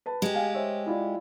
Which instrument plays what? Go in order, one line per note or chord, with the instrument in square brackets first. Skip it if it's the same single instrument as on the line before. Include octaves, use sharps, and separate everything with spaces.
[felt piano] B4 A5
[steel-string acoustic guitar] G#3 G4
[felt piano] F5 G5 G#5
C5 C#5 E5
E4 F4 D5